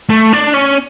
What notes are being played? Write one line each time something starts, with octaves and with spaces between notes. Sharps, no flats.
A3
D4
C#4